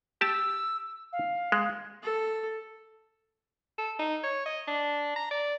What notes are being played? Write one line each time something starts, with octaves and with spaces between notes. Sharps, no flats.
G4 A5 E6
F5
G#3
A4
A4
D#4
C#5
D#5
D4
A#5
D5